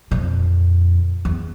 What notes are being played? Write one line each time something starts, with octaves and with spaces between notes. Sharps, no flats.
F2 A#2
E2